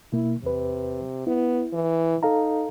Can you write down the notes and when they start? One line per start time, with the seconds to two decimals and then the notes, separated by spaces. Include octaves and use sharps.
0.13 B2 A#3 E4
0.43 E2 C3 B4
1.27 B3 E4
1.73 E3
2.23 D#4 A4 F5 A#5